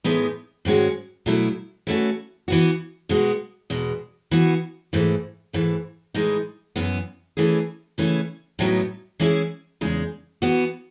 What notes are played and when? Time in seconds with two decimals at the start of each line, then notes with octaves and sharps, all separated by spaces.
0.04 A2 E3 G#3 B3 D#4
0.65 G#2 D#3 G#3 C#4 F#4
1.26 B2 F#3 A3 E4
1.87 E3 A3 C#4 F#4
2.48 E3 B3 F#4
3.09 B2 G#3 B3 F#4
3.70 E2 B2 G#3
4.31 E3 B3 F#4
4.93 G#2 E3 A3
5.53 G#2 E3 A3
6.14 A2 E3 G#3 D#4
6.76 F#2 E3 B3
7.37 E3 A3 C#4 G#4
7.98 C#3 E3 A3 C#4
8.59 A2 F#3 B3 D#4
9.20 E3 G#3 C#4 E4 G#4
9.81 E2 C#3 G#3 D#4 G#4
10.42 E3 B3 F#4